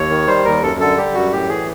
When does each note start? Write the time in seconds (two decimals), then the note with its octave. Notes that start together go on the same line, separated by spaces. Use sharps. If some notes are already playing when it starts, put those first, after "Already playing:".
Already playing: D#2 C#5
0.10 D#3
0.27 G3 C5
0.45 D#2 A#4
0.63 F#2 A4
0.80 D3 A4
0.97 G3 G4
1.14 F#2 F#4
1.32 A2 G4
1.49 E3 G#4